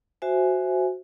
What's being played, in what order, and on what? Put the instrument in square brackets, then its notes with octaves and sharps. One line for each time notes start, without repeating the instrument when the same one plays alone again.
[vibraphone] F#4 C5 E5 G#5